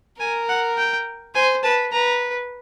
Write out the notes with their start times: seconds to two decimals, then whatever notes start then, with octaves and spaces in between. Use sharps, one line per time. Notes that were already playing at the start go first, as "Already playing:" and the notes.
0.20 A#4 G#5
0.49 F#5
0.78 G5
1.35 C5 G#5
1.63 B4 A5
1.92 B4 A#5